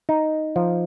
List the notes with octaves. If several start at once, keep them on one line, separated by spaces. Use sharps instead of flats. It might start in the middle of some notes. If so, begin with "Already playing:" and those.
D#4
F3